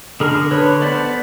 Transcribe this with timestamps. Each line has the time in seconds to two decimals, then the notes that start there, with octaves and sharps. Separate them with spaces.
0.20 D3 G#4 A#4
0.51 D3 B4 C#5
0.82 B3 C5 D5